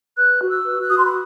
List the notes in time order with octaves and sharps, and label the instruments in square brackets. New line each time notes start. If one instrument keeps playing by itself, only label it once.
[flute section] B4 F#6
F#4
E6
B4
F#6
F#4 D#6
C6
B5